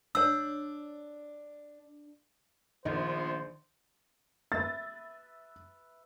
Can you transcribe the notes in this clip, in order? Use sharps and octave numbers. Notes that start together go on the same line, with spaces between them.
D4 C#5 E6
A#1 D#3 F3 B3 F4 C5
B4 E5 A6